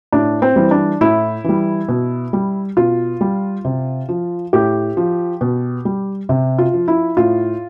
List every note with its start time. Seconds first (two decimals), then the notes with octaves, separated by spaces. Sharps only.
0.12 A2 D4
0.42 C4
0.56 E3 G3
0.71 D4
1.01 A2 E4
1.44 E3 G3
1.88 B2
2.33 G3
2.77 B2 F4
3.21 G3
3.65 C3
4.09 F3
4.53 A2 G4
4.97 F3
5.41 B2
5.85 G3
6.29 C3
6.58 F4
6.73 F3
6.88 E4
7.17 A2 F4